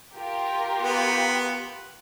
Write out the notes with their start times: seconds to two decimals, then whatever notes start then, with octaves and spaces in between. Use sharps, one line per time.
0.15 F4 G4 A#4
0.83 B3